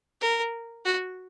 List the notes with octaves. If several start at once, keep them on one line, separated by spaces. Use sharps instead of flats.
A#4
F#4